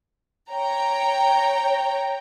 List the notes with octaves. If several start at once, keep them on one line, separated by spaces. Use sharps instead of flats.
C#5 G5 A#5